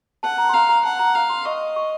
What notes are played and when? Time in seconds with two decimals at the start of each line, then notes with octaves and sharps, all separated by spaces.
0.23 F#5 A5
0.38 A#5
0.49 C6
0.54 F5 A#5
0.69 A#5
0.84 F#5 A5
0.99 A#5
1.15 F5 A#5
1.30 C6
1.45 D#5 C#6
1.76 C#6